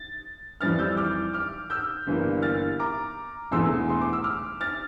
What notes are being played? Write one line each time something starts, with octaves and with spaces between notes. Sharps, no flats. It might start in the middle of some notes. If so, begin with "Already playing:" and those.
Already playing: A6
F2 E3 G3 F6 A6
E6 G6
D6 F6
D6 F6
E6 G6
G1 G2 E3 A#3
F6 A6
A#5 D6
E1 E2 E3 A3 C6 E6
C6
D6
E6
D6 F6
F6 A6